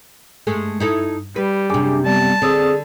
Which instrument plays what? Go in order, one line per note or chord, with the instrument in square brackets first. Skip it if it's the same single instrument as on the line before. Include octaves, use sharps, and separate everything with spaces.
[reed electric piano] G2 [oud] G#3 A3 A4
[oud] D#4 E4 A4
[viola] G3 [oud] B4
[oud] F#2 C3 [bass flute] D4 [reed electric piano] G#4 G#5 D6
[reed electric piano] G3 D5 [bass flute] B3 [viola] A5
[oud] D3 D5 [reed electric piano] C4 D#6 E6 [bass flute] G#4